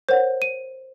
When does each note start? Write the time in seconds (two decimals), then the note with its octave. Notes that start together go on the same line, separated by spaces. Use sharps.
0.09 A#4 C5 C#5 F#5
0.42 D#7